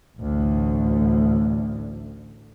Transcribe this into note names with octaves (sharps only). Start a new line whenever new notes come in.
A1 D2